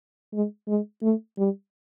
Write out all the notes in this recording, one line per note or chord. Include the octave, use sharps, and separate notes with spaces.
G#3
G#3
A3
G3